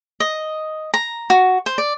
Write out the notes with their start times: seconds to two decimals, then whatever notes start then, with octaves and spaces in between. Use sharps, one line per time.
0.20 D#5
0.94 A#5
1.30 F#4
1.66 C5
1.78 D5